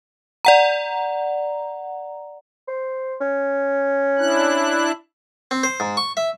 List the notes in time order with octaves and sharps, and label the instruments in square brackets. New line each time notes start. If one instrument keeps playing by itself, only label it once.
[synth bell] D5 F#5 A#5
[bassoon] C5
C#4
[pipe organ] D4 E4 F#6
[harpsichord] C4
C5
G#2
C#6
E5